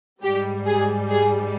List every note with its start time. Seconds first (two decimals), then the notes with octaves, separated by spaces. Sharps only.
0.23 G#2 G3 G4
0.66 G#4
1.09 G#4